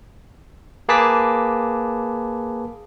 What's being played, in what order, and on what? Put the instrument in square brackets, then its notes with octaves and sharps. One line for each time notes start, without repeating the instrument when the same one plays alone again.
[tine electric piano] A#3 G#4 B4 A5 D6 B6